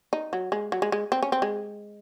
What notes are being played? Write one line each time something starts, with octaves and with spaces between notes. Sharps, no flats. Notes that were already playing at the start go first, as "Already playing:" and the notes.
D#4
F#3
G#3
F#3
G#3
G#3
C4
C#4
C4
G#3